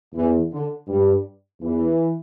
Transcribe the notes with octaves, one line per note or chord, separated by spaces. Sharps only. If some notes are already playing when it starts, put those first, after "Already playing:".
E2 E3
D3
G2 G3
E2 E3